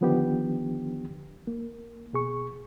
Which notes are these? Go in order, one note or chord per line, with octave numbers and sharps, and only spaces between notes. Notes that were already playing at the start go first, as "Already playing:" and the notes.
D3 D#3 F3 B3 D4 G4
A#3
B2 G#4 C#6